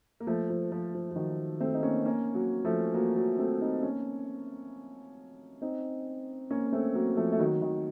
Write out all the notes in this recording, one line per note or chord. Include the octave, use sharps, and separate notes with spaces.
A#3
F3 A3
F3
F3
F3
F3
D#3 F#3
A3 C4
D#4
A#3 C#4
A#3 C#4
F#3 A#3
F3 A3
F#3 A#3
F#3 A#3
A3 C4
C4 D#4
A#3 C#4
C4 D#4
A#3 C#4
A#3
A3 C4
F#3 A#3
F3 A3
A3
D#3 F#3
D#3